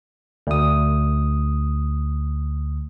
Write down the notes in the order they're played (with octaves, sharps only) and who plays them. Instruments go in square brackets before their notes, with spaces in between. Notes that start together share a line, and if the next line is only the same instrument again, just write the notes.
[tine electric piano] D2 D#6